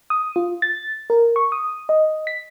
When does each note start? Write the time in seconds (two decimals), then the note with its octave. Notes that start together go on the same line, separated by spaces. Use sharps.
0.10 D#6
0.36 F4
0.62 A6
1.10 A#4
1.36 C#6
1.52 D#6
1.89 D#5
2.27 B6